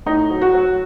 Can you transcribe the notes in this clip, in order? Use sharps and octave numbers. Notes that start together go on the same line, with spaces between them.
A2 D#4
F#3
F#4
F#3